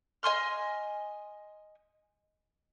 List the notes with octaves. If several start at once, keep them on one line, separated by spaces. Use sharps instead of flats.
D#5 G#5 C6 F6